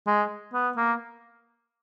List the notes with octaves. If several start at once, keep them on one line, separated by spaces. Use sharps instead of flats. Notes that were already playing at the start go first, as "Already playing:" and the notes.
G#3
B3
A#3